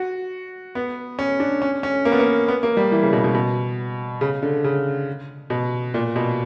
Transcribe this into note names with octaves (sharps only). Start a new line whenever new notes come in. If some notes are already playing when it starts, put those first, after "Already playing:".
Already playing: F#4
B3
C#4
D4
C#4
C#4
A#3
B3
A#3
B3
A#3
G3
E3
C#3
B2
B2
B2
C#3
D3
C#3
B2
A#2
B2